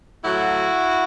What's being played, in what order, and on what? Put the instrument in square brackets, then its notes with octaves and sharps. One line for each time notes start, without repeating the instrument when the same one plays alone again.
[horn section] A2 F#3 E4 F#4